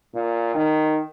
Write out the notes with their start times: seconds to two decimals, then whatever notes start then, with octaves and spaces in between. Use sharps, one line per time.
0.14 A#2
0.55 D#3